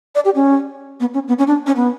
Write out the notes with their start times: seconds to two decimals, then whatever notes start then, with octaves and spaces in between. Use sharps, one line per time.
0.15 D5
0.25 G4
0.35 C#4
1.00 B3
1.14 C#4
1.28 B3
1.38 C#4
1.47 D4
1.66 C#4
1.76 B3